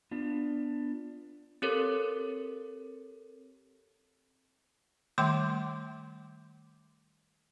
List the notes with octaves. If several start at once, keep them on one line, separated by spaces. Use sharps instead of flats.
B3 D4 F4
C4 G4 A4 A#4 C#5
D#3 G3 A3 G5 C6 D6